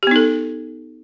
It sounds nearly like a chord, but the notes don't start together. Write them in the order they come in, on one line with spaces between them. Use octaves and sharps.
G4 B3 D#4 A4